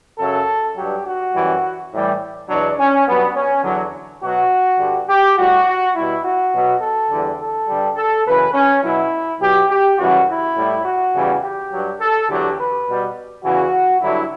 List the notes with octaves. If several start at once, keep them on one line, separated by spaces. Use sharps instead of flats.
F#2 C#3 F#3 A4
G2 F#3 G4
F#4
F#2 E3 G3
A2 E3 G3
E2 B2 F#3 D4
C#4
G2 F#3 B3
C#4
E2 D3 F#3
B2 F#3 F#4
G2 D3 G3
G4
A2 G3 F#4
B2 G3 E4
F#4
B2 F#3
A4
E2 D3 G3
A4
G2 D3 G3
A4
F#2 C#3 E3 B4
C#4
B2 F#3 E4
B2 F#3 G4
G4
F#2 C#3 E3 G3 F#4
E4
A2 G3
F#4
E2 C#3 E3 G3
G4
G2 F#3
A4
E2 D3 F#3 G4
B4
B2 G3
E2 C#3 E3 F#4
G2 D3 F#3 E4